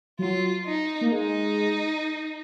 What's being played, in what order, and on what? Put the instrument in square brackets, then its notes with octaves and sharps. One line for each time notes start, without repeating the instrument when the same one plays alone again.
[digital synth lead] F#3 [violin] F4
[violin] D#4
[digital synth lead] A#3
[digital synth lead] G#3 [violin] D#4